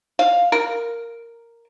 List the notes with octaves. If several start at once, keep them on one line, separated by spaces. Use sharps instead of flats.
F5
A#4